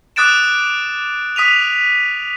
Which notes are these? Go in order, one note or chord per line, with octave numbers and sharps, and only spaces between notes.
D6 D#6 F#6 A6 D7 E7
D#6 B6 D#7 F7